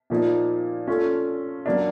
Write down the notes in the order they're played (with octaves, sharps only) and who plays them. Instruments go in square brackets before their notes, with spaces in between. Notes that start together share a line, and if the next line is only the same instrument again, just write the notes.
[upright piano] A#2 F3 A#3 D#4
A3 C#4 F4
F#3 A#3 D4